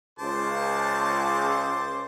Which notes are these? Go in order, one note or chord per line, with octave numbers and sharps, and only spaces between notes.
C#2 C5 A5 D6